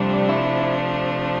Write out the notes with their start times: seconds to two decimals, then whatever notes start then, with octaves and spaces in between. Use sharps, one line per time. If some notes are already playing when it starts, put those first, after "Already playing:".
Already playing: C3 F3 G3 A3 D4
0.29 E4